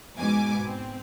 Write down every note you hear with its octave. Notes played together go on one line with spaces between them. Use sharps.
G#2 B2 G#5 D6
C4